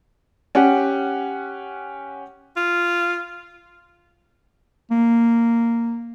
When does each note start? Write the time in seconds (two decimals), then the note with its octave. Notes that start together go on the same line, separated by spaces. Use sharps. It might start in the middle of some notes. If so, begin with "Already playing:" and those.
0.55 C#4 G4 F#5
2.56 F4
4.91 A#3